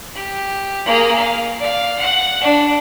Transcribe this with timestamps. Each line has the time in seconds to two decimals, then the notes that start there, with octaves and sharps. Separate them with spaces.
0.15 G4
0.86 A#3 G#4
1.15 F5
1.59 D5 F5
1.99 F#5
2.41 D4